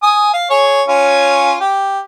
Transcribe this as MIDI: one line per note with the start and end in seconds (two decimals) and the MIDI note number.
0.03 0.30 80
0.03 0.30 87
0.33 0.46 77
0.50 0.82 68
0.50 0.82 73
0.88 1.57 61
0.88 1.57 65
0.88 1.57 73
1.61 1.99 67